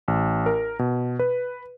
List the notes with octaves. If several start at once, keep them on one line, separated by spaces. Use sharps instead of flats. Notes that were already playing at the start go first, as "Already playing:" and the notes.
A1
A#4
B2
B4